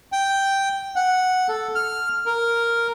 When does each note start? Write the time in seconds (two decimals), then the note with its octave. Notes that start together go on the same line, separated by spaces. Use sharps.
0.12 G5
0.96 F#5
1.48 A4
1.75 F6
2.26 A#4